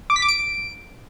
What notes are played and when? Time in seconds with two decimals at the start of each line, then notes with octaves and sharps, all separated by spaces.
0.10 D6
0.16 B6
0.22 D6
0.28 D7